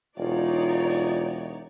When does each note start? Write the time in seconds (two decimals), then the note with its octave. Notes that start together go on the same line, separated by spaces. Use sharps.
0.18 E1 D#4 F4 C#5 D5